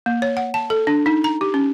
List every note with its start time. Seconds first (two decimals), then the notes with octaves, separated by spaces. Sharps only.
0.06 A#3
0.22 C#5
0.37 F#5
0.54 A5
0.70 A4
0.87 D4
1.06 D#4
1.24 A#5
1.41 G4
1.54 C#4